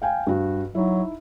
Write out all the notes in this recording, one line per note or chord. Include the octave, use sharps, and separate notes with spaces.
F5 G5 G#5
G2 F#4
F#3 D#4 E4